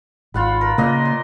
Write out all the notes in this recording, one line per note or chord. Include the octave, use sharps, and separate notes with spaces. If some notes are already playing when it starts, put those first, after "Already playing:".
G#1 F4 F#5 B5
A#4
A#2 C#3 A#3 D#5 C6
C6